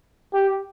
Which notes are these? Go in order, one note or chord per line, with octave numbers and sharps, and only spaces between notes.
G4